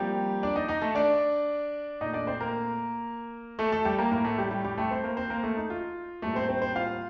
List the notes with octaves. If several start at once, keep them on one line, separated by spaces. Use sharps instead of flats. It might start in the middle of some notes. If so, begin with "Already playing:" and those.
Already playing: C3 F3 G3 A#3 G4
D4 D5
D#4 D#5
D#4 D#5
A3 A4
D4 D5
A#2 A3 D#4 D#5
D4 D5
C4 C5
A#3 A#4
A3 A4
A3 A4
G3 G4
A#3 A#4
A2 A3 A#3 A#4
A3 A4
G3 G4
G3 G4
G3 G4
A3 A4
C4 C5
A#3 A#4
C4 C5
A#3 A#4
A3 A4
D#4
F4
A2 G3 A3 A#3 A4
C4 C5
C4 C5
C4 C5
F4 F5